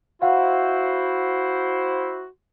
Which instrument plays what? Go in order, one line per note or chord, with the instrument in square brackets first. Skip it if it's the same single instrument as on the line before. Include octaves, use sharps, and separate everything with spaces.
[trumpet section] E4 C5 [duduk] F#4 [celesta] F5 F#5